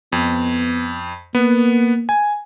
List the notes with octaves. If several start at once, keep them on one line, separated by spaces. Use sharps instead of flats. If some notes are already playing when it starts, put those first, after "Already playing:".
F2 B3
A#3 B3
G#5